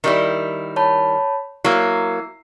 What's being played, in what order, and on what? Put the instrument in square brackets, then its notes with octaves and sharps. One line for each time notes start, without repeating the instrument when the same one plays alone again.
[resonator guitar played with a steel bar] D#3 G3 E4 [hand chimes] A#4
[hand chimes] C#5 A5 B5
[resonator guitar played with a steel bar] F#3 A#3 [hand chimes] E4 E6 C7